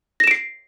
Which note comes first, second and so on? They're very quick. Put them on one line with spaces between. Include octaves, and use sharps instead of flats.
A#6 E7 D7 C7